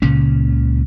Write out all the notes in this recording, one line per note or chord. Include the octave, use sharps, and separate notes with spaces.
C#2 A#2 C#3 C#4